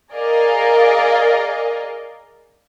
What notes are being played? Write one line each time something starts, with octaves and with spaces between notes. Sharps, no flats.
G#4 A#4 D5 D#5 F5